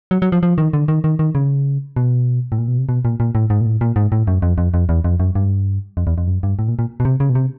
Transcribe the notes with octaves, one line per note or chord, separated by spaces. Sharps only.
F#3
F#3
F3
F3
D#3
D3
D#3
D#3
D#3
C#3
B2
A2
A#2
B2
C3
B2
A#2
A#2
A2
G#2
A#2
A2
A#2
G#2
A2
F#2
F2
F2
F2
E2
F2
F#2
G2
F2
E2
F2
F#2
G2
A2
A#2
A#2
B2
C3
C#3
B2
C3